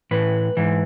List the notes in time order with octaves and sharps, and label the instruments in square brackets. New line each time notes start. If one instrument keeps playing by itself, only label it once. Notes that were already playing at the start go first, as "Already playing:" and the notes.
[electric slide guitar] A2 E3 B4
G#2 E3